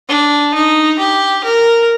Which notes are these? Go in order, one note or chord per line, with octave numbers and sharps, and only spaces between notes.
D4
D#4
G4
A#4